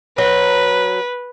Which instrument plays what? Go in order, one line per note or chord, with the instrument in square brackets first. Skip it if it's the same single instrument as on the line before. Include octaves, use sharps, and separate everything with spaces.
[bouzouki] F#3 [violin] B4